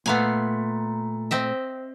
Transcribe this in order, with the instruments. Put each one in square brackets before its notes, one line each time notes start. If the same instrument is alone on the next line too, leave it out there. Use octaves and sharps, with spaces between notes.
[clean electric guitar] A#2 A3 [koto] B3 F5 G#5
[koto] C4 D#5 E5